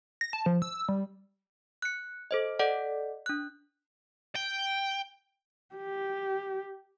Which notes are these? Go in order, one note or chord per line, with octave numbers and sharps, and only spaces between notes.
A#6
A5
F3
E6
G3
F#6 C#7
A4 C5 D#5
A4 D5 D#5 F#5
D4 F#6
G5
G4